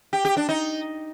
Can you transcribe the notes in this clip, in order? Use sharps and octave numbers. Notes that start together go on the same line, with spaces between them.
G4
G4
D4
D#4